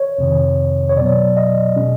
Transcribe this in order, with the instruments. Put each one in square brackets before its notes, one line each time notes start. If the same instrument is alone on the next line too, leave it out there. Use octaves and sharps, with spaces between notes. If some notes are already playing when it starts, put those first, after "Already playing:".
Already playing: [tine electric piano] C#5
F2 C3 D#3
C#5
B2 F#3 B3 D5
D#5
B2 G#3 C#4